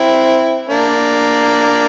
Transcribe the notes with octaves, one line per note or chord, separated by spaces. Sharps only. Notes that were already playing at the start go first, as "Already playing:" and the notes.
Already playing: C4 E4
A#3 D4